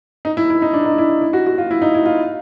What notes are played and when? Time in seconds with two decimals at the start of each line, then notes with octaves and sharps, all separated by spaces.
0.25 D#4
0.37 E4
0.50 E4
0.62 D#4
0.74 D4
0.86 D#4
0.98 E4
1.09 E4
1.22 E4
1.33 F#4
1.47 F#4
1.58 F4
1.71 E4
1.82 D#4
1.95 E4
2.06 F4